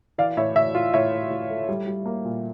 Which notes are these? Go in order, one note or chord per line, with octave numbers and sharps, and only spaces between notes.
E3 D5 F5
A2 C#5 E5
A2 C#5 E5
A2 F4
A2 C#5 E5
A2
A2
A3
G3
G3
A#3
A#2